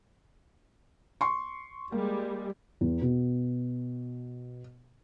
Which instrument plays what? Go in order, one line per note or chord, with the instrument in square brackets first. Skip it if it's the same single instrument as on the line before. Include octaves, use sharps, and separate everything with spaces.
[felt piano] C6 C#6
[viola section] G3 G#3 [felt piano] A#3
[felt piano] E2
B2